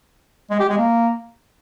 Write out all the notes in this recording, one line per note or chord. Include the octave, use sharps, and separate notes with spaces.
G#3
G4
G#3
A#3